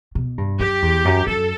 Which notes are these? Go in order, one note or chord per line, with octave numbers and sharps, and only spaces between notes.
B2
G2
F#2 G4
E2
F#2
F#2 A4